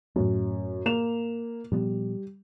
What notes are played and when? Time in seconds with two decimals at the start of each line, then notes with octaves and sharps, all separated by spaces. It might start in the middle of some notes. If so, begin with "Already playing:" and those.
0.16 F#2 A2 A3
0.86 A#3 E7 F7
1.72 A#2 F3 G3 B3